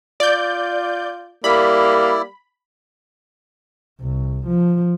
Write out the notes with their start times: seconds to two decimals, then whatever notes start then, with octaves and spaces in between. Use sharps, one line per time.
0.20 F4 D5 G6
1.44 G3 A#3 E4 D5 B5
4.01 C2
4.47 F3